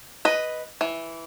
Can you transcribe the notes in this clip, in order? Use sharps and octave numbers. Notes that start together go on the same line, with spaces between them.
B4 D#5
E3